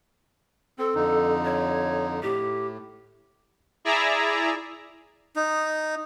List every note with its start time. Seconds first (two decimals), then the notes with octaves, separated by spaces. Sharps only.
0.79 C4 A4
0.95 F2 D3 D#4
1.45 C#5
2.23 A2 G4
3.85 E4 G#4 D5 E5 A#5
5.36 D#4